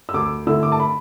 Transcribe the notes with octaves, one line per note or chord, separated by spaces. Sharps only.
E6
D2 D6
D3 A3 E4 E6
D6
A5
B5